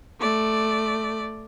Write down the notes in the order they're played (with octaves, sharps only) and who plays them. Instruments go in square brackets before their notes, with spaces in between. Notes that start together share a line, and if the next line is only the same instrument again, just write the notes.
[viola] A3 D5